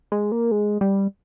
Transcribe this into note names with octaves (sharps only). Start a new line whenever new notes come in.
G#3
A#3
G#3
G3